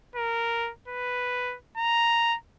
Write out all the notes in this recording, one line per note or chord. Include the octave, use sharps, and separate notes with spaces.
A#4
B4
A#5